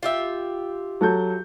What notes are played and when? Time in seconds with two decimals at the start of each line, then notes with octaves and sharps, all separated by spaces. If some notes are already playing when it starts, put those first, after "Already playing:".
0.03 F4 G4 E5
1.01 F#3 A4 G6